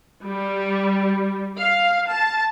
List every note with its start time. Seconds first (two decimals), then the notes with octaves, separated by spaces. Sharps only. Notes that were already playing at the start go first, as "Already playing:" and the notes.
0.23 G3
1.59 F5
2.10 A5